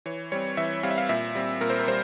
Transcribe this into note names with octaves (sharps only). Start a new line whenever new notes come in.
E3 C#5
G3 C4 C#5
E3 E5
G3 C4 F5
E5
F5
A#2 E5
G3 C4
A#2 A#4
C5
A#4
G3 C5